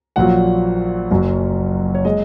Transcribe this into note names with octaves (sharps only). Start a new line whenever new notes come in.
A#1 A#2 F#3 F#5
F#1 F#2 F#3
C#5
G#3 D#5